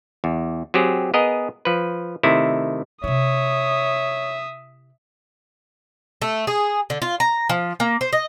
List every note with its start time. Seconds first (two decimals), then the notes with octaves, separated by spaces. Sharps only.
0.24 E2
0.74 F#3 C4 G4 G#4
1.14 B3 G#4 A#4 D#5
1.65 F3 B4
2.23 C3 D#3 A3 E4
3.04 C3 E4 C#5 E5 D#6
6.22 A3
6.47 G#4
6.90 D3
7.02 F4
7.20 A#5
7.49 F3
7.80 A#3
8.01 C5
8.13 D#5